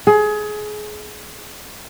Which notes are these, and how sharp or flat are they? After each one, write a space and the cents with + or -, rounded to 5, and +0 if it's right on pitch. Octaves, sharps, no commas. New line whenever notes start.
G#4 +25